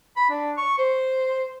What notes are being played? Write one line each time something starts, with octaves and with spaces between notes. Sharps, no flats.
B5
D4
C#6
C5